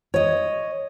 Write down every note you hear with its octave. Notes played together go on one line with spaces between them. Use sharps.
C#5 D#5